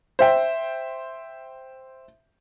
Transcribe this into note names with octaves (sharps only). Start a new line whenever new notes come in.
C5 E5 G5